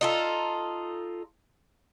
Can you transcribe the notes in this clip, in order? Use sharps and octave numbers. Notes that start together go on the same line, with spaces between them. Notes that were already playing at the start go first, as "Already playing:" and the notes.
D#4 F4 A4